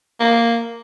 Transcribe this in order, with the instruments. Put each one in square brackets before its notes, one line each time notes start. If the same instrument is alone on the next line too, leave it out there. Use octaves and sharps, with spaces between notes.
[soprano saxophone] A#3